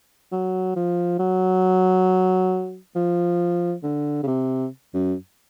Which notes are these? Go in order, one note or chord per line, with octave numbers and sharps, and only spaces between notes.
F#3
F3
F#3
F3
D3
C#3
C3
F#2